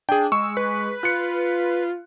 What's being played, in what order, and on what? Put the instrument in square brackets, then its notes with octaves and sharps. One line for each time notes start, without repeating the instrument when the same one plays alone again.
[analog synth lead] D4 [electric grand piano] G#4 G5
[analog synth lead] G#3 [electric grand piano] C#6 [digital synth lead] E6
[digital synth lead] B4
[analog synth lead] F4 [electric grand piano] F#6 C#7